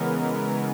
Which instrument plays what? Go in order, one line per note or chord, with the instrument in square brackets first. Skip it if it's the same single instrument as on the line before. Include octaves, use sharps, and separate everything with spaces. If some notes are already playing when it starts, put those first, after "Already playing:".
Already playing: [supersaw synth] C#3 E3 G#3 B3 A#4